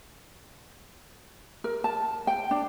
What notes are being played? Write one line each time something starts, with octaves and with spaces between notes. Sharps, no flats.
A#4
A5
G5
D4